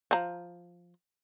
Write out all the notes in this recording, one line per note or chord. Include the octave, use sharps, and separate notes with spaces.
F3 A#5